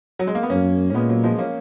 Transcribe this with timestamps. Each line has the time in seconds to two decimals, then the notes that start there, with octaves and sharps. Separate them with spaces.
0.19 F#3
0.27 G#3
0.35 A#3
0.43 B3
0.50 F#2 A#3 C#4
0.90 C#4
0.94 A#2 G#3 B3
1.09 F#3 A#3
1.24 F3 G#3
1.38 A#3 C#4